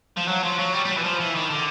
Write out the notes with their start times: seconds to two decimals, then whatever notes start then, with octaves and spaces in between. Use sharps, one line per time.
0.17 F3
0.28 F#3
0.43 F3
0.59 F#3
0.74 G3
0.85 G3
0.89 F#3
0.97 E3
1.04 F3
1.20 E3
1.35 D#3
1.50 D3